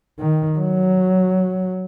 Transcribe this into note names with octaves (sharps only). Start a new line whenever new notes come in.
D#3
F#3